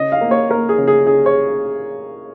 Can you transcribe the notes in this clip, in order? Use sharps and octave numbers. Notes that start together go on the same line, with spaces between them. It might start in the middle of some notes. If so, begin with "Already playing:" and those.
Already playing: C#3 D#5
F5
A#3
C#5
A#3 A#4
G#4
C#3
G#4
C#3 G#4
C#5